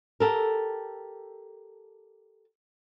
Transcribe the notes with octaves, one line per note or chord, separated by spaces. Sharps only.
G4 A4 A#4